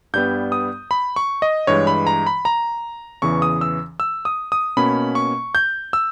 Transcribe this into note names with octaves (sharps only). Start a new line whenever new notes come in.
G2 G3 B3 G6
D#6
B5
C#6
D#5
G2 E3 G#3 C#5
B5
A#5
B5
A#5
E2 C#3 E3 C#6
D#6
E6
E6
D#6
D#6
B2 A#3 C#4 B5
C#6
G6
E6